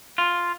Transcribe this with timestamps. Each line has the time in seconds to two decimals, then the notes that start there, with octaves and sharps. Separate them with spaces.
0.18 F4